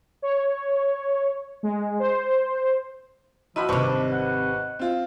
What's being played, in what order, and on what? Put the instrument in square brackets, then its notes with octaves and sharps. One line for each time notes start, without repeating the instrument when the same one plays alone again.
[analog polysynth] C#5
G#3
C5
[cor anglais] F3 [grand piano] E4 F#4 B5 [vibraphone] D#5
[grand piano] G#1 B4 C#6 [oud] C3 G3 [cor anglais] D4
[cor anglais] F#5
[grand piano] C4 F4